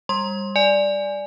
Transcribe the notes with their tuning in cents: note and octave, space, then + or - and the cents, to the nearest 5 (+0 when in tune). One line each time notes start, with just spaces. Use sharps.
G3 +20 C6 +15
D5 +0 G#5 +0